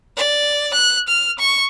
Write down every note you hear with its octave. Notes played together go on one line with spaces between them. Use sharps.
D5
F#6
F6
C#6